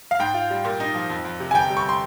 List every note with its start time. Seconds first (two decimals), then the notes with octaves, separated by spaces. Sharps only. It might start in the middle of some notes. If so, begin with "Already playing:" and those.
0.11 F5
0.19 G#2 G5
0.34 F4
0.50 G3
0.65 A#2
0.80 D#4
0.95 F3
1.10 F2
1.25 F2
1.40 C3
1.51 G#5
1.54 G1 G5
1.70 G3
1.77 C#6
1.89 C6